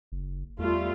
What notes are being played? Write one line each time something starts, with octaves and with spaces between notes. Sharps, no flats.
F#1
E2 G3 A3 F4